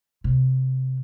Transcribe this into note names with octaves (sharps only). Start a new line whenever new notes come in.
C3